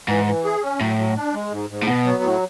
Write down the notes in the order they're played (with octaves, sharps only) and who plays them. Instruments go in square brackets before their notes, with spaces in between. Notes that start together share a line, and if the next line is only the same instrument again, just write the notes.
[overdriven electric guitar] G#2 [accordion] E3
[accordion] E3
G#4
C#4
[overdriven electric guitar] A2 [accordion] F#3
[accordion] F#3
D4
G#3
G#2
G#2
[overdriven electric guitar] A2
[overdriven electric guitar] B2 [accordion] B3
[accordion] F#3
A2